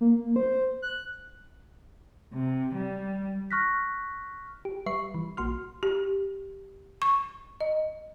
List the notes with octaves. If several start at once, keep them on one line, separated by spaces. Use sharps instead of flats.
A#3
C5
F#6
C3
G3
C#6 F6 F#6 A#6 B6
G4
G3 B4 E5 C#6 C7
E3
A#1 A#3 F#4 C6 F6
G4
C#6
D#5